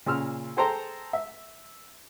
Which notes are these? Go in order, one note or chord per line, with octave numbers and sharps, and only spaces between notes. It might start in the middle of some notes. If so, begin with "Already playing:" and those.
A#2 C#3 C6 E6 F6
G#4 A4 C5 G5 A#5
E5